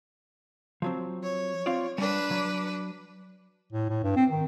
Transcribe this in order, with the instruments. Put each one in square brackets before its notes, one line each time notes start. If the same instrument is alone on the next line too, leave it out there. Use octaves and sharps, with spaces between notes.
[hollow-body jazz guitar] F3 F#3 C4
[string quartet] C#5
[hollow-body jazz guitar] C4 F4 D5
[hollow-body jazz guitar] G3 [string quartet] D4 B4
[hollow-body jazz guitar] F#3
[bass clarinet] A2
A2
G2
C4
D#3